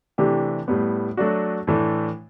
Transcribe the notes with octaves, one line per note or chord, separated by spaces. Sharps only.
C3 E3 A3 D4 G4
A2 G3 B3
F#3 A3 D4 F#4
A2 E3 A3 D4